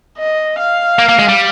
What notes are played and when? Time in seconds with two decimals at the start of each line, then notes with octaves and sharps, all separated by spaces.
0.18 D#5
0.58 F5
0.99 A#3
1.09 A#3
1.19 G#3
1.29 G3